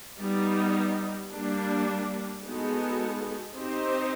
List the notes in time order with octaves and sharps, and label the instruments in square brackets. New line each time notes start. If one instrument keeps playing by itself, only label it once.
[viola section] G3 B3 D#4
G3 A#3 D4
G#3 B3 D#4 F#4 A4
C4 D#4 G4 C5